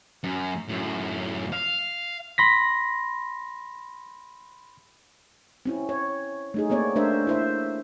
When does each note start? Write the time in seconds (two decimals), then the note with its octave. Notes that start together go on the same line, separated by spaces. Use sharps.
0.24 F#2
0.69 F#2 A2
1.52 F5
2.38 B5 C6 A#6 B6
5.66 C4 C#4 E4
5.89 C#5
6.54 A3 D#4 G#4
6.70 A#3 C4 C#5 D5
6.96 A3 D4 A#4 C5 E5
7.27 E4 C5 E5